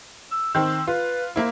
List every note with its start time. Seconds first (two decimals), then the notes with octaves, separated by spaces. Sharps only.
0.31 E6
0.55 D#3 C4 E6
0.87 F4 B4
1.36 A#3 E4 C5